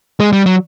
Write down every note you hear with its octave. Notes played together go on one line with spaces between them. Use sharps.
G#3
G3
F#3